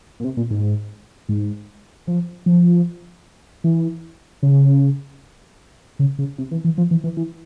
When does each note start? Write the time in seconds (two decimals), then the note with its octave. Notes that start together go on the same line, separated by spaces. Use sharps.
0.20 A#2
0.24 C3
0.37 A#2
0.51 G#2
1.29 G#2
2.07 F3
2.46 F3
3.64 E3
4.43 C#3
5.99 C#3
6.19 C#3
6.38 C3
6.51 E3
6.64 E3
6.78 F3
6.91 E3
7.04 E3
7.17 E3